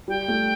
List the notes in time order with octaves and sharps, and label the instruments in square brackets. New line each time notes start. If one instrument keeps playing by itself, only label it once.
[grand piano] G3 [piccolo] G5
[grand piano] A3